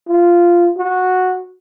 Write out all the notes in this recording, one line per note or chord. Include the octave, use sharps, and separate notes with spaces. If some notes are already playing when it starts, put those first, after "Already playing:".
F4
F#4